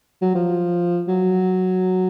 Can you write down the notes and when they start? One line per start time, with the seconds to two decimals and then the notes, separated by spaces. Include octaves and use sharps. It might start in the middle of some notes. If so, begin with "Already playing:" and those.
0.22 F#3
0.35 F3
1.08 F#3